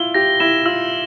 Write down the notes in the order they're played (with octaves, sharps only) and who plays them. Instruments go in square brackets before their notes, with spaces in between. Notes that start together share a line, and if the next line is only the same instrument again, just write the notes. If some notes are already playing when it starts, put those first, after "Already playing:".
Already playing: [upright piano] E4 F4 [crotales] G7
[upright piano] G4 [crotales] A#6
[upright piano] E4 [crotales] E7
[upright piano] F4 [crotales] E6